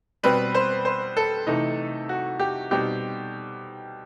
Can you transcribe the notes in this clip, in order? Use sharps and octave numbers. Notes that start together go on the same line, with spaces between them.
B2 G3 C4 B4
C5
C5
A4
C3 E3 A3 D#4
F#4
G4
B2 G3 C4 D#4 G4